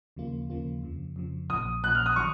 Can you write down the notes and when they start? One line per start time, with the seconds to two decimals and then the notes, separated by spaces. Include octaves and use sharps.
0.16 D#2 C#3 F3 A#3 F4
0.50 D#2 C#3 F3 A#3 F4
0.83 F2 C#3 F3
1.16 F2 C#3 F3
1.50 A#1 A#2 F3 D#6
1.82 A#1 A#2 F3 F#6
1.95 F6
2.06 D#6
2.16 D#3 F#3 C#6